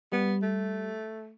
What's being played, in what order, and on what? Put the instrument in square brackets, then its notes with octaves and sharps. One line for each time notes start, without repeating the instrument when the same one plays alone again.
[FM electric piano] G3 [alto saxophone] B3
[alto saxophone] A3